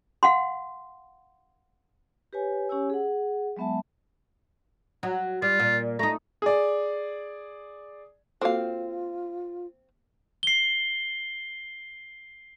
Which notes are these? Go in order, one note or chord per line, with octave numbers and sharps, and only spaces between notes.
F5 F#5 C6
G4 B4 C#5 G#5
C#4 G4 C#5 G#5 E6
G#4 F#5
F#3 G#3 B3 E5 A5
F#3
G3 F4
A#2
A3 D#4 A#5
G#4 D5
A#3 C4 F4 F#4 A4 F5
C7 G7